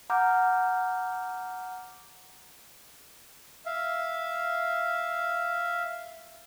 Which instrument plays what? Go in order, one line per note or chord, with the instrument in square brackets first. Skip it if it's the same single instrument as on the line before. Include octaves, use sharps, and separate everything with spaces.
[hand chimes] F#5 A#5 D6 F6 G6
[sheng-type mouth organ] E5 F5